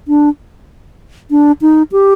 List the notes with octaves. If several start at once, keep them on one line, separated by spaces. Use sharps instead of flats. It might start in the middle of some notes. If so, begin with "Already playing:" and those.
D4
D4
D#4
G4